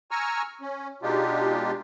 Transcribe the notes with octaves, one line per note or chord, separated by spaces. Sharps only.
G#5 A#5 C#6 E6 F6
C#4
B2 G#3 D4 D#4 F4 G4